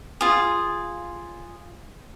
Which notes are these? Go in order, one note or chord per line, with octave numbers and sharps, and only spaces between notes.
F4 G#4